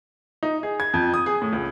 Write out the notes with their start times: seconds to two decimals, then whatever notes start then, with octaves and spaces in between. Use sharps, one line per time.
0.43 D#4
0.63 G#4
0.80 G#6
0.94 F2
1.14 D#6
1.26 G#4
1.42 A2
1.53 C#2